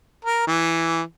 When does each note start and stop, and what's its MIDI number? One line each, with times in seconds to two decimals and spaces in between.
0.25 0.43 70
0.47 1.02 52